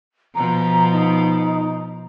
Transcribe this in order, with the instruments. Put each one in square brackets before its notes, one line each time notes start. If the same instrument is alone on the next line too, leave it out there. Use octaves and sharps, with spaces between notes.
[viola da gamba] B2 F3 [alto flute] A#5
[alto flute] D#4